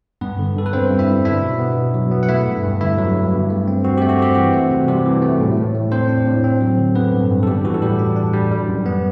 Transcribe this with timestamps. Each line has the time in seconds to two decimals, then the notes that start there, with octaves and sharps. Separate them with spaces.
0.21 G2 B3 B4
0.39 D3
0.56 G2 A4
0.66 B4
0.73 G2 C4 C5
0.90 G2
0.99 E4 E5
1.08 G3
1.25 D4 E4 E5
1.43 B2
1.59 B3
1.77 B2
1.94 F#3
2.12 B3
2.23 F#5
2.29 A3 E4 E5
2.47 G2
2.64 G2
2.81 D3 E4 E5
2.98 F#3
3.15 G2
3.33 G2
3.50 A3
3.68 C4
3.84 C4 F#4
3.98 A3 G4
4.09 F#4
4.19 C4 G4
4.35 E3 F#4
4.54 A3
4.71 C3
4.88 C3 G3 G4
5.05 E3
5.22 A3
5.40 A2
5.57 A2
5.75 A3
5.91 C4 D4 C5
6.09 D4
6.26 A2
6.44 C4
6.61 F#3
6.78 D3
6.95 D3 B3 B4
7.12 G2
7.30 G2
7.43 A4
7.47 G3 G4
7.65 E3 F#4
7.74 A4
7.82 A2 G3 G4
7.99 D4
8.16 D4
8.33 G3
8.51 G3
8.68 F#2
8.86 B3